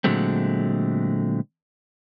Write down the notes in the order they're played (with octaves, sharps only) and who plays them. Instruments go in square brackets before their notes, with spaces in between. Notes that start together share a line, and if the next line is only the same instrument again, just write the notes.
[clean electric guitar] A#2 D3 F#3 G#3 A3 C4